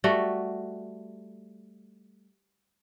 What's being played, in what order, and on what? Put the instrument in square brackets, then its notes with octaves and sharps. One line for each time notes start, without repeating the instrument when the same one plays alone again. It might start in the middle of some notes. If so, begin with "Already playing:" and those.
[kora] G3 A3 F#4